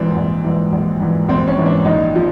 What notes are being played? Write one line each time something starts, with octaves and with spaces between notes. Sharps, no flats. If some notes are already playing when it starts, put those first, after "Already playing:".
Already playing: A#1 G#2 E3 C4
A#1
G#2 E3
A#1
G#2 E3
A#1 C4
C#4
G#2 E3
D4
A#1 D#4
F3